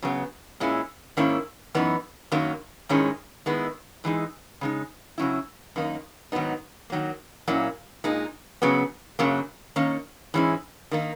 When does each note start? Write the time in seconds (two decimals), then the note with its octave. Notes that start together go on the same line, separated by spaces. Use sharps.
0.02 C#3 F#3 B3
0.60 A#2 G#3 C#4 E4
1.17 G#2 D#3 A#3 C#4 E4
1.74 F#2 E3 B3 D#4
2.32 F#2 D#3 F#3 A#3
2.89 G#2 D#3 G#3 C#4 E4
3.46 D#3 G#3 B3 E4
4.04 G#2 E3 G#3 D#4
4.61 C#3 G#3 D#4
5.18 C#3 F#3 C#4 E4
5.76 F#2 D#3 A#3 D#4
6.32 G#2 D#3 F#3 B3 D#4
6.90 D#3 F#3 A#3
7.48 A#2 F#3 A#3 C#4 E4
8.04 A#2 G#3 D#4
8.62 F#2 C#3 F#3 B3
9.19 F#2 C#3 F#3 A#3
9.76 D#3 A#3 C#4
10.34 G#2 E3 G#3 C#4 E4
10.91 D#3 A#3 D#4